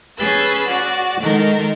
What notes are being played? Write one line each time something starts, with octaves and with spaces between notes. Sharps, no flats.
C#4 G#4 B4 E6 A6
F#4 D5
D#3 G#3 D#4 A4 A#4